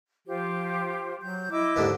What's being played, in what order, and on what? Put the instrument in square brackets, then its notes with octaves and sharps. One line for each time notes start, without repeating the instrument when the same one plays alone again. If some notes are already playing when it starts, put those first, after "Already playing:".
[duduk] F3 [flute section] F4 G4 C5
[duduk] F#3 [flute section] G6
[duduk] E4 [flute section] D#5 D6 E6
[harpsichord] D#2 G#2 D3